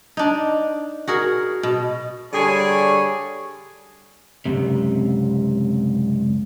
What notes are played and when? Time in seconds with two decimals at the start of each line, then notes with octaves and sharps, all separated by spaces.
0.17 D4 D#4
1.08 F#4 G#4 A#4
1.63 B2
2.33 D3 G3 G#4 C#5
4.46 C#2 F#2 C3